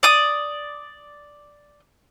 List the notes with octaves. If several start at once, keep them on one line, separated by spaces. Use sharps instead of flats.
D5 D#6